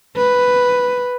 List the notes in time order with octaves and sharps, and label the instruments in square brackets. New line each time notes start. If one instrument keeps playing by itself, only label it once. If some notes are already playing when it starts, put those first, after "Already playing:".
[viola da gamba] B4